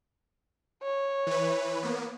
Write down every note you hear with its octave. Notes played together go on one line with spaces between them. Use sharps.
C#5
E3 B4
A#3 B3